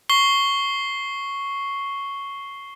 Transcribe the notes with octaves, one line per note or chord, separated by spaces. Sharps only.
C#6 C7 G7